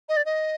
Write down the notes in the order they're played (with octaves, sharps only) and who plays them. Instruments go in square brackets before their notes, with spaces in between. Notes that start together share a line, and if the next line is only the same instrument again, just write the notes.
[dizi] D#5
D5
D#5